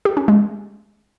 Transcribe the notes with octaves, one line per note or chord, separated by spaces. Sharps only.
G4
C#4
G#3